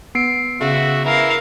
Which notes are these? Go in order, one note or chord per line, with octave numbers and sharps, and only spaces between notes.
B3 C7 D7
C#3 F#4 E5
E3 E4 A#4 F5